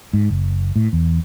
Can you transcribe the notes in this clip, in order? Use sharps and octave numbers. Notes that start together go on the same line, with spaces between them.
G#2
F#1
A2
E2